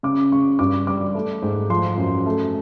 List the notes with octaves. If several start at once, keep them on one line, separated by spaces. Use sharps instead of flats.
C#3 D6
C#3 C#6
G2 D6
G3 D6
A3
G#2
F3 C6
F#2
A3